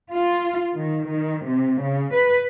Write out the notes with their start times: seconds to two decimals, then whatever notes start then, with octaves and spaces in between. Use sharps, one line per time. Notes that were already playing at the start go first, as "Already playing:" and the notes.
0.11 F4
0.77 D#3
1.09 D#3
1.46 C3
1.82 C#3
2.14 B4